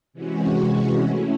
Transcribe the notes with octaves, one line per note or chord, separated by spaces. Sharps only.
C3 E3 G#3 C#4 F#4
A3 C#4 E4